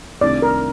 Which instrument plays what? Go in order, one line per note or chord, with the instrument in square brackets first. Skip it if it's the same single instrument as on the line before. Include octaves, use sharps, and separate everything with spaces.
[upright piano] C2 C3 D#3 A3 D4 [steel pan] D5
[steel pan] A#4